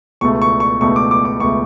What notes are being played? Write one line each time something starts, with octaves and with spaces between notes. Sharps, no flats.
C#2 B2 A3 C#6
C#6
C#6
C#2 B2 A3 C#6
D6
D6
D6
C#2 B2 A3 C#6